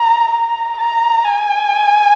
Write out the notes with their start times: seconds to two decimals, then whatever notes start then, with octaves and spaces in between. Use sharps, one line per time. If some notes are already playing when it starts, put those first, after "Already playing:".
Already playing: A#5
0.31 A#5
0.78 A#5
1.25 G#5